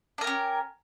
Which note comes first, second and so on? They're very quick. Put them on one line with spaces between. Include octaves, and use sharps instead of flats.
D4 A#4 G4 C#4